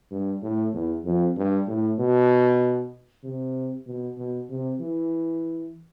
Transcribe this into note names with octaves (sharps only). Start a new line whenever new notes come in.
G2
A2
E2
F2
G2
A2
B2
C3
B2
B2
C3
E3